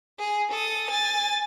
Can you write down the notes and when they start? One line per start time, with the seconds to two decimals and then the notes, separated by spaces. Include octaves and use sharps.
0.19 G#4
0.51 A4 D#6
0.90 G#5 A6